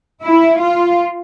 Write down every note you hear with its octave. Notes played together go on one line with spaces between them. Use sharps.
E4
F4